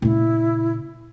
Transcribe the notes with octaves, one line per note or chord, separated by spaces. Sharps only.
A#2 C#3 E4